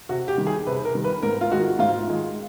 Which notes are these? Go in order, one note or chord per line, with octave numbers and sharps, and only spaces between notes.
C3 F#4
G4
D#3 G3
G#4
C3 B4
A#4
D#3 G3
B4
G#2 A#4
F4
D#3 G#3 F#4
G#2 F4
D#3 G#3